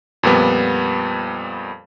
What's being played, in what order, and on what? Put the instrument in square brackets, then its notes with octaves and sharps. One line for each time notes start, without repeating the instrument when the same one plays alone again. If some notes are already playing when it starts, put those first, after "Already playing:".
[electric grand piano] F2 A#2 G3 B3